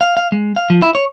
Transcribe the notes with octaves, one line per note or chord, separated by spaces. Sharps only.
F5
F5
G#3
F5
F3
E4
C#5